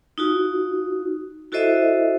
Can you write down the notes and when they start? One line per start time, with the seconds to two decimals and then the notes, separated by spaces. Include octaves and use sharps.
0.18 D#4 F4 F#4
1.52 E4 F#4 A4 C5 D#5 E5